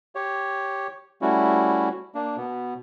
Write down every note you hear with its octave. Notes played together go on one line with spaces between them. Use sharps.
G4 C#5
G3 A3 C#4 E4 F#4
A#3 D4
B2 B3